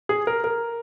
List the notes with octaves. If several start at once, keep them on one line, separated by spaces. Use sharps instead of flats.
G#4
A#4
A#4